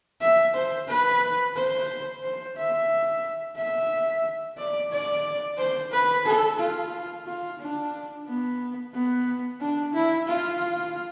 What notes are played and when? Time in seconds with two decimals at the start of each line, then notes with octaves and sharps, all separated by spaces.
0.21 E5
0.54 C5
0.88 B4
1.56 C5
2.23 C5
2.57 E5
3.56 E5
4.58 D5
4.92 D5
5.58 C5
5.91 B4
6.25 A4
6.60 F4
7.27 F4
7.59 D4
8.27 B3
8.94 B3
9.61 D4
9.94 E4
10.28 F4